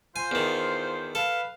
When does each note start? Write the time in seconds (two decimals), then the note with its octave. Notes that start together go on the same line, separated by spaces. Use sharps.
0.16 F4 C5 G#5
0.31 E2 D#3
1.15 A4 B4 F5